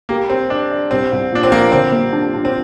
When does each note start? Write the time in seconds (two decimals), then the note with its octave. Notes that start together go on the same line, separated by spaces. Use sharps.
0.09 A#3 G4
0.30 C4 G4
0.50 D4 D5
0.71 D5
0.91 C2 C4
1.12 C2
1.31 A#2 D4
1.43 C4
1.52 F3 A#3
1.72 D3 C4
1.92 A#3
2.13 D4
2.34 D4
2.45 C4